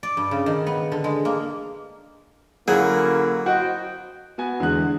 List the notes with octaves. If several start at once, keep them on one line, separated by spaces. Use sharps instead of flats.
D5
G2
C#3
D#3
B3
D3
G#3
A#3
D3 F#3 A#3 C#4 E4 G#4
F#4 C5 D#5 G5
B3 F#4 G#5
E2 D3 G#3 F#6